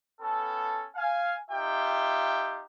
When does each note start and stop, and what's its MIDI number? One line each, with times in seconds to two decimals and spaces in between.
0.21 0.85 59
0.21 0.85 61
0.21 0.85 69
0.95 1.35 77
0.95 1.35 80
1.51 2.63 63
1.51 2.63 65
1.51 2.63 67
1.51 2.63 76
1.51 2.63 79